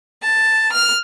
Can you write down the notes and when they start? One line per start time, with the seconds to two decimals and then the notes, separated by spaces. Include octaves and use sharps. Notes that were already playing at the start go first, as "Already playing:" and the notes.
0.23 A5
0.72 F6